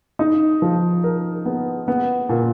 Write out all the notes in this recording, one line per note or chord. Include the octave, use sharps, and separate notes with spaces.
D#4
F3
A#4
B3
B3
A#2